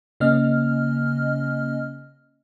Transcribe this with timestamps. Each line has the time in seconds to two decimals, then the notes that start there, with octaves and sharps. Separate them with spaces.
0.20 C#3 A#3 C#4 D#5 F6